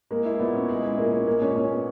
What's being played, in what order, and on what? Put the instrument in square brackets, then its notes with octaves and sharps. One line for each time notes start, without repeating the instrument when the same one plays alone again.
[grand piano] G#3 [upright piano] A#3
[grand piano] E4
[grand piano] A#2 [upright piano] B3
[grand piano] C#4
G#3
E4
[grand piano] A#2 [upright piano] A#3
[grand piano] C#4
[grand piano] G#3 [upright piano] A#3
[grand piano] A#2 [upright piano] C#4
[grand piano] A#2 [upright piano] C#4
[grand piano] B3